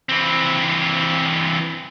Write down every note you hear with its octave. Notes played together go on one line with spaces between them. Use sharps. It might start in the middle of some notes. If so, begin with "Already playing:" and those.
E3 C4